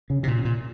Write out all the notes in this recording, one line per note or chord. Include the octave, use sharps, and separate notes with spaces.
C#3
C3
A#2
A#2